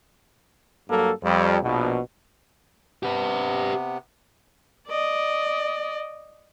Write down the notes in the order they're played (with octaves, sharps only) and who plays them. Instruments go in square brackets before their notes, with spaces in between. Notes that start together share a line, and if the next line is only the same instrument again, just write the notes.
[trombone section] G2 F#3 A#3 A4
F2 G3
A#1 B2
[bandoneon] C3 B3 [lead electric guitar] G4 B4
[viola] D5 D#5